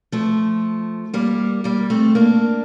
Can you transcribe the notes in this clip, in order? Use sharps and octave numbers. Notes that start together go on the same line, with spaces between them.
F3 A3
G3 A#3
G3 A#3
A3 C4
A#3 D4